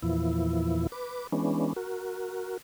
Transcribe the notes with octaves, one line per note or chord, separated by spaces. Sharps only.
E2 A#2 E3 F3 E4
B4 D6
E3 G#3 B3 C#4 D4
F#4 A#4